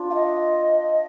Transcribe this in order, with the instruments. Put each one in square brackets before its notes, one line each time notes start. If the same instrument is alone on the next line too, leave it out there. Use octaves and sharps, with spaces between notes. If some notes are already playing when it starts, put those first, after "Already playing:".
Already playing: [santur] D4 F4 C5
[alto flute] F5
D#5